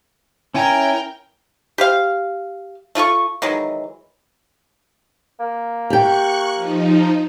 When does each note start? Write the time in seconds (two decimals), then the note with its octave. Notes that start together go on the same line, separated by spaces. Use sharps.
0.54 C#4 E4 A#4 G5 G#5
1.78 G4 C5 F5
2.95 A3 F4 A4 C#6
3.42 D#3 E3 F#3 G#3
5.40 A#3
5.90 G4 G5 C#6 F#6
6.55 F3 D#4